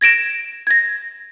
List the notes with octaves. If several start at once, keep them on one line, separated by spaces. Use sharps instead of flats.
G#6 A#6 D7 E7
G#6 A#6